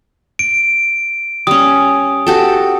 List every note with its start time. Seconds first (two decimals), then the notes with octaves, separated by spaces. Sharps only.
0.39 D7
1.47 G3 C#4 D#6
2.27 F#4 G4 A4